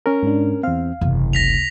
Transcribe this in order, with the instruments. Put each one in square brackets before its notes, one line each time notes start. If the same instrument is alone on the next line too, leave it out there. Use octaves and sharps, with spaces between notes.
[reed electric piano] C#4 A#4
[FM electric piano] G#2 D4
[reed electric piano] E2 C4 [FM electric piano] F5
[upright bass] F#1 C3 [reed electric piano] E2
[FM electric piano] C#2 [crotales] A#6 B6 F7